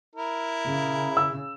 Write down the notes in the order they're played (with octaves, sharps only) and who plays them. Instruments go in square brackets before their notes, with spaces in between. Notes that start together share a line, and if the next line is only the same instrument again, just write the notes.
[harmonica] E4 A#4
[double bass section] C#3
[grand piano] E6